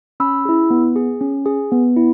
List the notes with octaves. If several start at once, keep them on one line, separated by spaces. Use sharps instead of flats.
C#4 B5 E6
E4 G#4
B3
G#4
C#4
G#4
B3
E4